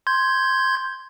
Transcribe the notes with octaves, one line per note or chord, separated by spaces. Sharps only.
C6 G6 G#6